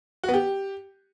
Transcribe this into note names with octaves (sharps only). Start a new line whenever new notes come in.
F#4
B3
G4